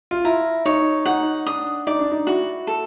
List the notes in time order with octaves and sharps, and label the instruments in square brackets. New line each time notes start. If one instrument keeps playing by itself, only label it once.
[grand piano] F4
[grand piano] E4 [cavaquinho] A#5
[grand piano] D#4 [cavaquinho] C#5
[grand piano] D#4 [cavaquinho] F#5
[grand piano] D4 [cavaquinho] D#6
[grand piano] D#4 [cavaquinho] D5
[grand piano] D4
D#4
[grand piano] E4 [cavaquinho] F#4
[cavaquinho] A4